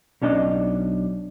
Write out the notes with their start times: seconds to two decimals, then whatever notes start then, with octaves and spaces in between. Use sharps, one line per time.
0.21 B1 C#4 D4 D#5